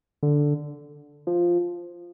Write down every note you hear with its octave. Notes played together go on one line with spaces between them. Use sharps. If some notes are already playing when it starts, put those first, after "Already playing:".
D3
F3